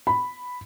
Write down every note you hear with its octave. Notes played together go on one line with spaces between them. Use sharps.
B5